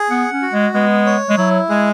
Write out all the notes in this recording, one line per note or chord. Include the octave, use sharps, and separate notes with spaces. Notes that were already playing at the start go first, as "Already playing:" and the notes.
Already playing: G#4
B3 F#5
C#4
F#4
G#3
G#3 B3
C#5
G#3
F#3 E4
G#3 G#4